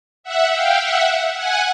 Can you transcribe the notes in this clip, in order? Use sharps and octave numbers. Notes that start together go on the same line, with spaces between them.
E5 F#5
F5 G5
E5 F#5
F#5 G#5